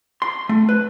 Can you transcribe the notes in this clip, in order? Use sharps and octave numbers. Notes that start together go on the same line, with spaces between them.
C6
A3
B4